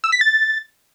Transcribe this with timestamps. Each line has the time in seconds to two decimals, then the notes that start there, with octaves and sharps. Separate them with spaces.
0.04 E6
0.12 B6
0.21 A6